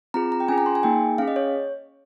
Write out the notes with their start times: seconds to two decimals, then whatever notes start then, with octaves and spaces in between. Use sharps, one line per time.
0.14 C4 F4 G#4 A#5
0.32 A#5
0.40 G5
0.48 C#4 F4 G#4 G#5
0.58 A#5
0.66 C6
0.75 G#5
0.83 A#3 D#4 G#4 G5
1.18 C#4 G#4 F5
1.28 D#5
1.36 C#5